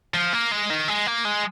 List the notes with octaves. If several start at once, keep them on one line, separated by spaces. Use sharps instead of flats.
F3
A#3
G#3
D#3
G#3
A#3
G#3